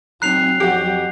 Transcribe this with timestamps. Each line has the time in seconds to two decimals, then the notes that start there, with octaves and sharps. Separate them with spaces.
0.22 F#3 C4 D#4 A#5 F#6 C7 F7
0.60 F2 F#4 G4